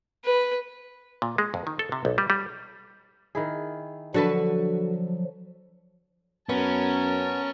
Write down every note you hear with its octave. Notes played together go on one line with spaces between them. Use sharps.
B4
A#2
G#3
F2
D#3
A4
C3
B1
G3
G3
D#3 E4 G#4
D3 F3 F#3 F#4 A4 B4
F#2 B3 C#4 A#4 A5